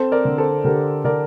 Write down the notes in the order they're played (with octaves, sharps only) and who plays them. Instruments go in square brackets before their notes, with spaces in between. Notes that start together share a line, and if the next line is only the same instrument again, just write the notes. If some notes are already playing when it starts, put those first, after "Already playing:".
Already playing: [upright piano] C4 [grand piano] A4 C5
[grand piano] A#4 D5
[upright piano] D3
[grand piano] A4 C5
[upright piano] D3 [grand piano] G4 A#4
[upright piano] D3 [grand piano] A#4 D5